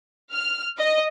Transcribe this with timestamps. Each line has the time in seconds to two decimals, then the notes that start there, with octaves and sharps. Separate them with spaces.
0.33 F6
0.78 D#5